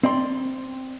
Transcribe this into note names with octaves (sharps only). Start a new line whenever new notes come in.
C4 D5 C6